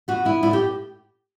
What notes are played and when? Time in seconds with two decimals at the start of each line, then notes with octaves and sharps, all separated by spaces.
0.08 B3 F#4
0.25 B3 E4
0.43 A2 E4
0.53 G4